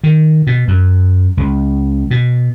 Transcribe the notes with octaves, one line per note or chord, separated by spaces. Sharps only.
D#3
B2
F#2
C#2
B2